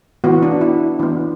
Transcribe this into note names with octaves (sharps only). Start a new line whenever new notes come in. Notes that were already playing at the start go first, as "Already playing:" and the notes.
E3 B3 F#4
D4
E4
E3 B3 D4